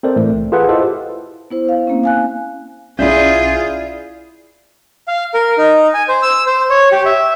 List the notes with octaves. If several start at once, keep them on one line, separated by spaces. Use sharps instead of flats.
C4 A4 A#4 C5 D5
A2 E3 A3
C2
F4 G#4 A4 B4 F#5
E4 F4 G4 A4 C5 D#5
B3 E4 C5
F5
A#3 C4 C#4
F5 G#5 F#6
B1 C#4 E4 F4 G#4 D5 E5 G6
F5
A#4
D#4
G#5
C5
E6
C5
C#5
G4
E5